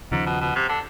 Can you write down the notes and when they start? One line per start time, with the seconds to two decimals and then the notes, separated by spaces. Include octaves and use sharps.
0.11 D#2 G#2 C#3 F3
0.26 B2
0.41 B2
0.55 C3
0.69 D3